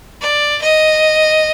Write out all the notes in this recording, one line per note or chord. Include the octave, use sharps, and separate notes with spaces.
D5
D#5